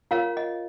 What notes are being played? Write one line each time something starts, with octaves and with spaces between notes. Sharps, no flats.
F4 A#4 C#5 F5
D#5